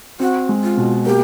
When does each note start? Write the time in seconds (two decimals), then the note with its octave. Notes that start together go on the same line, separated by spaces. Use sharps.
0.20 C4 F#4
0.49 G#3
0.63 F4
0.77 B2
1.06 A#3 G4